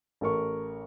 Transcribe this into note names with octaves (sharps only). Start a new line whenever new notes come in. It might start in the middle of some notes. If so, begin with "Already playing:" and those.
A1 A4 A#4 C#6